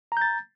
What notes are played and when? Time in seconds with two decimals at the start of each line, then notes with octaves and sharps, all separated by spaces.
0.12 A#5
0.17 G6
0.22 A6